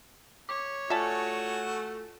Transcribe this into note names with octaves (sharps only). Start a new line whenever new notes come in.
C#5 D6
A3 F4 F#4 E5 G#5 A5